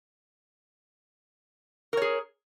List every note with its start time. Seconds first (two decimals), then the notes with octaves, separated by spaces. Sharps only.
1.93 A#4
1.97 C#5
2.02 G#4